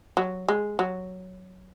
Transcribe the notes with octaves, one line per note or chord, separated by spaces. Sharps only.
F#3
G#3
F#3